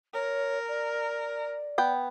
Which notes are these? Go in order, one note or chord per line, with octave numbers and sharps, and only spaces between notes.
A#4 C#5
D5
B3 G5